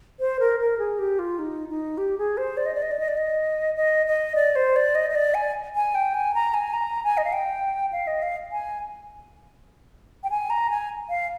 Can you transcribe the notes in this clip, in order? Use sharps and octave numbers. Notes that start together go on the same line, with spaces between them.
C5
A#4
A#4
G#4
G4
F4
D#4
D#4
G4
G#4
C5
D5
D#5
D5
D#5
D5
D#5
D5
D#5
D#5
D#5
D5
C5
D5
D#5
D#5
D5
G#5
G#5
G5
G#5
A#5
G#5
A#5
G#5
D#5
F5
G5
F5
D#5
F5
G#5
G5
G#5
A#5
G#5
F5